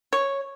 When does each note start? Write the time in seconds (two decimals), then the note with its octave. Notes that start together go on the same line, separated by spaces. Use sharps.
0.13 C#5